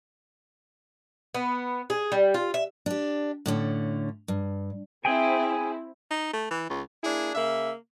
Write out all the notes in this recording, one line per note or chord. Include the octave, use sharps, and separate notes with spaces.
B3
G#4
G3
F4
E5
D4 G4
A2 D3 C#4
G2
C4 E4 G#4 G5 G#5
D#4
A3
E3
C#2
A#3 D4 E4 G#4
C#3 A#3 E5